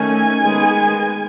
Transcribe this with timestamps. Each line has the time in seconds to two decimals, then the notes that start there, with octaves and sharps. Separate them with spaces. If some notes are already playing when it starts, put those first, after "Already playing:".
Already playing: D#3 A3 C#4 G#5
0.42 D#3 G#3 B3